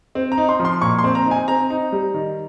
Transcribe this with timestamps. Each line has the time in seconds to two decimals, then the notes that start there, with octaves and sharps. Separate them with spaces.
0.15 C4
0.32 A#5
0.38 D#4
0.49 C6
0.60 F3
0.65 C6
0.82 A#2 C#6
0.98 C6
1.04 C4
1.15 A#5
1.26 D#4
1.31 G#5
1.48 C4 A#5
1.70 D#4
1.92 G3
2.14 D#3